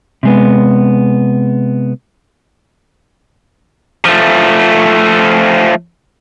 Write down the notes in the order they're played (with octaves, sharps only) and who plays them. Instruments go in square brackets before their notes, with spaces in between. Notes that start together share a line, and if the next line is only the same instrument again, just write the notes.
[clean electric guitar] C3 G#3 B3
[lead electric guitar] F3 A3